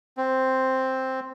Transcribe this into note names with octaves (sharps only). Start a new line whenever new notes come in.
C4